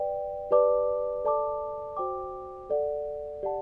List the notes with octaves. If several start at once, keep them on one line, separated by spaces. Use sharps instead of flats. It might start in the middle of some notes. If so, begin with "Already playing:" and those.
Already playing: B4 D5 G5
G4 B4 D5 A5 D6
A4 D5 A5 D6
F#4 C5 G5 D6
A4 D5 F#5
G4 D5 F#5 A5